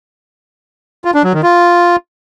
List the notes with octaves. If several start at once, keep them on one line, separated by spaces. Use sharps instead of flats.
F4
D4
F#3
D#3
F4